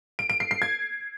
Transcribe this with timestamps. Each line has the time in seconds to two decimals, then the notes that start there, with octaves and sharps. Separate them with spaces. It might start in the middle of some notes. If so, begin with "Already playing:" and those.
0.19 D7
0.30 D7
0.40 C7
0.51 C7
0.62 G#6